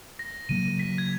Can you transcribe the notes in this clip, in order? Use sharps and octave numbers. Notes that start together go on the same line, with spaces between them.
A#6
C#3 F#3 A#3 D#7
B6
G#6